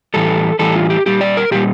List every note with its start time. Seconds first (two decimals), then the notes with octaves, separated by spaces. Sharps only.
0.14 A2 E3 G3 A4
0.59 A2 E3 G3 A4
0.76 F4
0.90 G4
1.06 A#2 G3 G4
1.21 D5
1.37 A#4
1.51 A#2 G3 G4